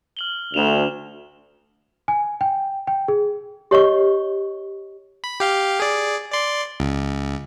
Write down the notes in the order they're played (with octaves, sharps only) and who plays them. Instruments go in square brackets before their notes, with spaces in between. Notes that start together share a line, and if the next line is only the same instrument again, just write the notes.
[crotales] F6 F#7 G7
[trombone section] D2 [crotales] E7 F7
[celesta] G#5
G5
G5
G#4
[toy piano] G4 C#5 D#5 C#6
[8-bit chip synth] B5
G4 F5 G5
G#4 D5
D5 C6
C#2